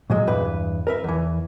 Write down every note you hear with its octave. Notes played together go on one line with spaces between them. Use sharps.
A#2 F#3 G#3
E2 G2 B4
A#4 B4 E5
E2 E3